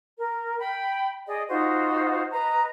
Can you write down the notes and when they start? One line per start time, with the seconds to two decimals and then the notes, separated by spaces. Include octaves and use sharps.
0.20 A#4
0.59 G5 B5
1.28 G#4 D5 D#5
1.49 D#4 F4 F#4 C5
2.31 B4 D#5 A#5